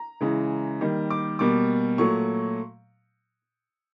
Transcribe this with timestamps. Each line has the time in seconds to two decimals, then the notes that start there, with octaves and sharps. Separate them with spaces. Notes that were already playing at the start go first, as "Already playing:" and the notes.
Already playing: A#5
0.21 C#3 E3 G#3
0.81 D#3 G3 A#3
1.10 D6
1.39 B2 G3 A#3 D6
1.98 A#2 F#3 A3 C#6